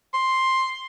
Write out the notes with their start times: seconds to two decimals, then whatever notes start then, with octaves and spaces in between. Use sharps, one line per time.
0.14 C6